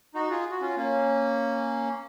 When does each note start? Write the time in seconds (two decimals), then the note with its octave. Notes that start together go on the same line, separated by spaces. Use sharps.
0.14 D#4 F#4
0.30 F4 G#4
0.51 F#4
0.61 C#4 F4
0.77 A#3 C#4